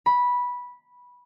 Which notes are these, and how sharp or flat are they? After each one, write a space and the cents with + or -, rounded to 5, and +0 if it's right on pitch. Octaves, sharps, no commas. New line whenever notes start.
B5 -10